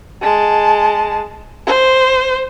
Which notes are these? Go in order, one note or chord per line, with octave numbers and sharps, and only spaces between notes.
G#3 A5
C5